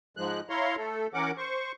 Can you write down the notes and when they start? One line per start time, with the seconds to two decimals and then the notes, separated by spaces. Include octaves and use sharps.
0.17 G#2 F3 G#3 F#6
0.50 E4 C#5 F5 A#5 C6
0.77 A3 A4
1.14 E3 C#4 A#4 F#5 D6
1.37 C5 C#6